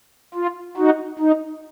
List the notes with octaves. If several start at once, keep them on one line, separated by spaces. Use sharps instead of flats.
F4
D#4 F#4
D#4